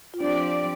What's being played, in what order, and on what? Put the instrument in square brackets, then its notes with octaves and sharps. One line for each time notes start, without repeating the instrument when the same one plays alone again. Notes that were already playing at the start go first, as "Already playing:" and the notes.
[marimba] F4
[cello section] F3 C4 G4 D5 [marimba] D4